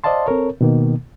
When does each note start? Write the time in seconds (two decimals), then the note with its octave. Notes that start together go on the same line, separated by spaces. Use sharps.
0.04 C5 D5 D#5 F5 A5 C6
0.26 C4 A4 A#4 C#5
0.61 B2 D#3 A#3